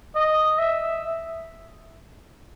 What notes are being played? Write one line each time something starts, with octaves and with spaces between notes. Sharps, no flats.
D#5
E5